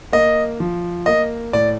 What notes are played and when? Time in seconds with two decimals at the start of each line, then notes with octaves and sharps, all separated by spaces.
0.12 A#3 D#5
0.60 F3
1.06 A#3 D#5
1.53 A2 D5